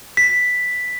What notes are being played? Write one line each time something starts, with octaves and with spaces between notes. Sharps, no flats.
B6